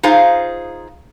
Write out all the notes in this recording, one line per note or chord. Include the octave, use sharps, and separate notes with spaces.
D#4 F4 G#4 C5 F5